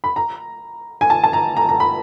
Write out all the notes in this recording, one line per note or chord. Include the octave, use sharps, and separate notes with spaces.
B5
A#5
G#5
A5
A5
A#5
A#5
A#5
B5